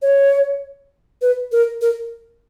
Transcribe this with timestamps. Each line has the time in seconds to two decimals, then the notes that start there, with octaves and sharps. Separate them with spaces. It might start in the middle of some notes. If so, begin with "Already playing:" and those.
0.02 C#5
1.22 B4
1.52 A#4
1.82 A#4